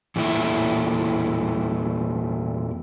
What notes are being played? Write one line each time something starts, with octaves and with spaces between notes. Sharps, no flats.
E2 A#2 A3 E4 E5